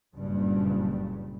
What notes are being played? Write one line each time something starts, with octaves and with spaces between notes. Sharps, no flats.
F#1 G2 A#2 C#3 G3